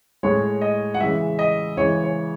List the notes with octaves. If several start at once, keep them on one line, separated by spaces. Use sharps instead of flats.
A2 G#3 C#5
D#5
F#5
C#3 E3 G#3 E5
D#5
C#3 E3 G#3 C#5
C#5